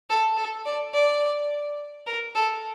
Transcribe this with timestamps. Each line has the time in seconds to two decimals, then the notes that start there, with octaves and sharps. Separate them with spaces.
0.10 A4
0.37 A4
0.65 D5
0.94 D5
2.07 A#4
2.35 A4